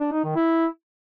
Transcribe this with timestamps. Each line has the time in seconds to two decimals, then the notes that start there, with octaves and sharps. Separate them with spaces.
0.01 D4
0.12 D#4
0.24 D#3
0.36 E4